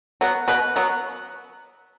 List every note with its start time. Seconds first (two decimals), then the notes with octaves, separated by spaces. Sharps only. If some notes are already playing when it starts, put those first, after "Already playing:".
0.21 F#3 B3
0.48 B2 B4
0.76 F#3 B3